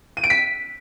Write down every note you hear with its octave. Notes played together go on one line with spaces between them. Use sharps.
D#7
D7
B6